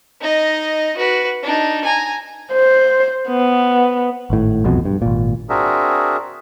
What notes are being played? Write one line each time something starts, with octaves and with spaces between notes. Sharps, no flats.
D#4 D#5
F#4 B4
D4 D#4
G#5 A#5
C5
B3
G#1 A2
E1 B1 F2 B2
G2
G#1 A#2
C4 D4 F#4 G#4 A#4 E5